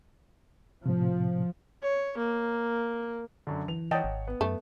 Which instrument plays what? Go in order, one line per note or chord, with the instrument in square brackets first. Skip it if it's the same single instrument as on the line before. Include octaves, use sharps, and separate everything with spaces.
[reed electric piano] A2 C3 [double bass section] F3
[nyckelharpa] C#5
A#3
[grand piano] F#2 D3
[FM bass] E3 [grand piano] F7
[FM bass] E3 [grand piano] C#5 F#5 [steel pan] D#5 G5 A5
[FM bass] G#1
[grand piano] B3
[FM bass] F#2 [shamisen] A3